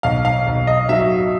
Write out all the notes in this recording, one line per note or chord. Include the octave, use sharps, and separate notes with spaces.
B1 F5
F5
B1
D#5
F#3 E5